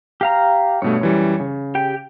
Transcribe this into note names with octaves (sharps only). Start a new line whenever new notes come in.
G4 F5 A#5
G2 B2 A3 C#5
F#2 E3 G3
C#3
G4 G5